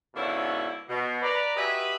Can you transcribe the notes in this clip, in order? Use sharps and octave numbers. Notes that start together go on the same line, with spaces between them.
G#2 B2 D3 A#3 C#4 E4
B2
B4 D5 A#5
F#4 G4 B4 D#5 E5 G#5